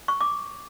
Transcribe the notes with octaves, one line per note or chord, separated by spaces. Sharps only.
C#6
D6